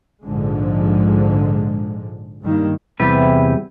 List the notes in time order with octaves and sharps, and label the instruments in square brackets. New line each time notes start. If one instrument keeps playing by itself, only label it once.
[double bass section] A#1 G#2 D3 F3 G#3
G2 D#3 G3 A#3
[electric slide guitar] E2 C3 G3 E4 G4 B4